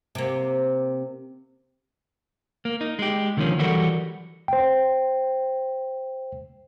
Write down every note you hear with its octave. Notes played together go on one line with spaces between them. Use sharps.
C3 A#3
A#3
D#4
G#3 G4
D3 D#3 F3 A#3 C#4
E3 F#3 G3 F#4 A4 A#4
C5 G5